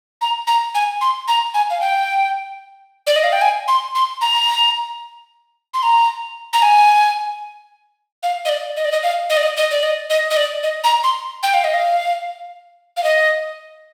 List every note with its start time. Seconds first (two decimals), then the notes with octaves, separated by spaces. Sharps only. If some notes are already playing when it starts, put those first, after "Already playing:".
0.21 A#5
0.47 A#5
0.75 G#5
1.01 C6
1.28 A#5
1.54 G#5
1.70 F5
1.81 G5
3.07 D5
3.16 D#5
3.24 F5
3.32 G5
3.41 G#5
3.68 C6
3.95 C6
4.21 A#5
5.74 C6
5.83 A#5
6.53 A#5
6.62 G#5
8.23 F5
8.45 D#5
8.49 D5
8.77 D#5
8.85 D5
8.92 D#5
9.03 F5
9.30 D#5
9.37 D5
9.43 D#5
9.57 D#5
9.71 D5
9.83 D#5
10.10 D#5
10.30 D#5
10.37 D5
10.63 D#5
10.84 A#5
11.04 C6
11.43 G5
11.54 F5
11.64 D#5
11.74 F5
12.97 F5
13.04 D#5